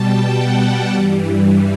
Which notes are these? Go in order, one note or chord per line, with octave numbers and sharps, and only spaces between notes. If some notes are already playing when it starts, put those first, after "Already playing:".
Already playing: B2 G3 G5 A5
F#5
G2 E3 G3